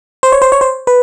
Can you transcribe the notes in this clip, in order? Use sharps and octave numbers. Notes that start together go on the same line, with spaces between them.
C5
C#5
C5
C#5
C5
B4